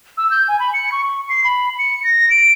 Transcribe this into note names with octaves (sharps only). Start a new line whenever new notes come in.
E6
G6
G#5
B5
C#7
C#6
C7
B5
C#7
A#6
D7